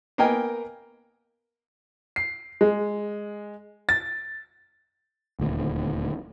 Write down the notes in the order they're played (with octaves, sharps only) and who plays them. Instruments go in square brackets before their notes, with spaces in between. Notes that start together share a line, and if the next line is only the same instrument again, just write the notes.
[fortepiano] A#3 B3 A#4 D#5 G5 G#5
[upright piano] C7
G#3
A6
[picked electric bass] D#1 D2